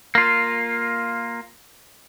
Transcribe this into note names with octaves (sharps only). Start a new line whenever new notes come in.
A#3 F4